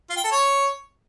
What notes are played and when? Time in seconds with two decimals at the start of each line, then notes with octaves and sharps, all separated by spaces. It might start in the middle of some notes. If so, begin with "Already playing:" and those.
0.10 F4
0.17 G5
0.24 A4
0.31 C#5